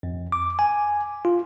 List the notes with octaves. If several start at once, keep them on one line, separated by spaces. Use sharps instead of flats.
F2
D6
G#5
F4